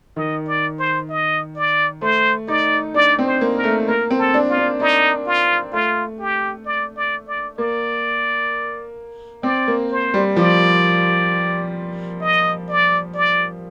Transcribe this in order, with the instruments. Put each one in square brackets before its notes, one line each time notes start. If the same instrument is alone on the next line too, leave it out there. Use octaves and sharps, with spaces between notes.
[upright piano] D#3 [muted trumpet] D#5
[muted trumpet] D5
C5
D#5
D5
[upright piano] A3 [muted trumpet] C5
[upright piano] D#4 [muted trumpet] D5
[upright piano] D4 [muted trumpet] D5
[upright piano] C4
[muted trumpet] C5
[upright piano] A#3
[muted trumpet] A#4
[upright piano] A3
[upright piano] A#3 [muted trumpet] A#4
[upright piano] C4
[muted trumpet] A4
[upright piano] D4
[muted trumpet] F4
[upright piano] D4
[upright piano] D4 [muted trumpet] D#4
[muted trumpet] F4
[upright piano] A3 [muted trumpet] F4
[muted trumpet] G4
D5
D5
D5
[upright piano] A#3 [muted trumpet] D5
[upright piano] C4 [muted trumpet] D5
[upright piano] A#3
[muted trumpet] C5
[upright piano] G3
[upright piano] F3 [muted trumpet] D5
[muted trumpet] D#5
D5
D5